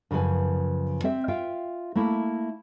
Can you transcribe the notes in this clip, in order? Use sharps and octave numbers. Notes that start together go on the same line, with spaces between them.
F#2 C#3 F3 B4 G#5
C4 C5 E5
F4 E5 F5 G5
A3 A#3 E4